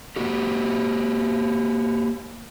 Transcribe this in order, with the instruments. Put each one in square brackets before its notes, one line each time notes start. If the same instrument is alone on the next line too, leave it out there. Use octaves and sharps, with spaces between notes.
[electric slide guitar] A#3 F#4 G4